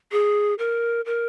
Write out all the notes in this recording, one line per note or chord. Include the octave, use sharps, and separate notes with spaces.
G#4
A#4
A#4